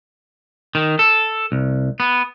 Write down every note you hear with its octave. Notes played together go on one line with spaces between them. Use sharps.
D#3
A4
C2
B3